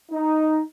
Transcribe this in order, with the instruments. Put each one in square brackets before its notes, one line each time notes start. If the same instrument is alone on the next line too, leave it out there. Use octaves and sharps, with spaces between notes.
[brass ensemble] D#4